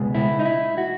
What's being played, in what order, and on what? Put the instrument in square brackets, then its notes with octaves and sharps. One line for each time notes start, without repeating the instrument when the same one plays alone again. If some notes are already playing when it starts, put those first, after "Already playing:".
Already playing: [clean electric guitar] C#2 B2 G#3 B3
E4
D#4
E4
F#4